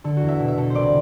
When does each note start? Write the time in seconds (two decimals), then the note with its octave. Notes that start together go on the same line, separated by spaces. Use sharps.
0.04 D3 A4
0.17 F#4
0.22 E2
0.28 E5
0.40 B2
0.48 E5
0.58 B2 A4
0.70 C5
0.75 C2 D5